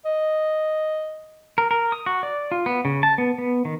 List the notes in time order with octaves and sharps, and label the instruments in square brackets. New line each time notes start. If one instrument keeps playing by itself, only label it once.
[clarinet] D#5
[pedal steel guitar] A#4
A#4
D#6
F#4
D5
F4
B3
C#3
A5
B3
B3
D#3